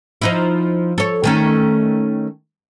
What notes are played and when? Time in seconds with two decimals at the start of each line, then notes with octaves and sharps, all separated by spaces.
0.22 F3 D#4 E4
0.98 A4 C#5
1.24 D#3 A3 C#4